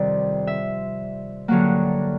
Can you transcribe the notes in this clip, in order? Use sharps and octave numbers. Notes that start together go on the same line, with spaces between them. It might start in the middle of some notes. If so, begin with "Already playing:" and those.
Already playing: F2 C3 D#3 G3 D5
E5
G2 D3 F#3 A#3 F#5